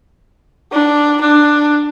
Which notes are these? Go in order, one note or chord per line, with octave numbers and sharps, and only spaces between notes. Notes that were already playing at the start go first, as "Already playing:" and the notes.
D4
D4